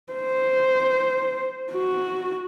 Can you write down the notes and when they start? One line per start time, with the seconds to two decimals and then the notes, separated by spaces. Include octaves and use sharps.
0.13 C5
1.73 F#4